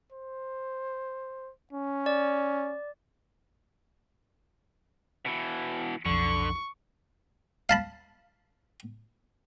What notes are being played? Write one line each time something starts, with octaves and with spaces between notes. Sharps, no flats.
C5
C#4
D5
B2 E3
B1 F2 D3 C#6
F5 A5 B5